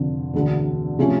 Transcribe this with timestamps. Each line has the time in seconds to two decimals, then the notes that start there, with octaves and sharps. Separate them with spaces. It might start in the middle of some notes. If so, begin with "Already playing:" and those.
Already playing: F1 F2 D3
0.34 E1 D2 D3
0.99 C3 F3 A3 C#4